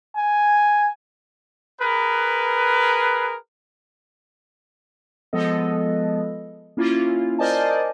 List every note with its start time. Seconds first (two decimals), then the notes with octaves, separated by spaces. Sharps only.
0.17 G#5
1.81 G#4 A#4 B4
5.33 F3 G#3 B3 A4 D#5
6.77 A#3 C#4 E4 F4
7.39 A#4 C5 D5 D#5 G#5 A5